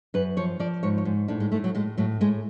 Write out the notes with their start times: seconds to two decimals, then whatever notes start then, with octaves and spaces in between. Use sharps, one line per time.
0.14 F#2 B4
0.37 F3 C#5
0.60 F3 D5
0.83 G#2 C#5
0.98 C#5
1.05 G#2
1.28 A2 D4
1.40 G#3
1.52 A2 A3
1.64 F#3
1.75 A2 G#3
1.97 A2 F#3
2.21 A2 G#3